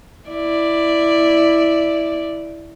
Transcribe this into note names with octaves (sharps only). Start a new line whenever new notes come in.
E4 D5